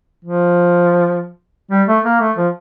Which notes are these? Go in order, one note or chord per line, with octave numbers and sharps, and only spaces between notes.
F3
G3
A3
A#3
A3
F3